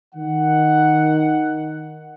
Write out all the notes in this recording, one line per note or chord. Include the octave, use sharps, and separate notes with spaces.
D#3 F#5